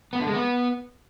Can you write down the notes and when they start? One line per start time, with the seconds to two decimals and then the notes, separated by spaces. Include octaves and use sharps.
0.13 B3
0.20 D3
0.27 G#3
0.34 B3